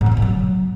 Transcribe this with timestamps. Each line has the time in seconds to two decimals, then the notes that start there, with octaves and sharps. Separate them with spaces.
0.01 G#2
0.06 F3
0.12 D#3
0.17 A#2
0.22 F#3